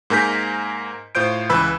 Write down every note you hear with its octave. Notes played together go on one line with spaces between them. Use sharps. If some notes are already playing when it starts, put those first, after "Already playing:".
G#2 A#3 A#4 G#5 G6 B6
A2 F4 C5 G6 D7
C#2 E3 B4 B5 E6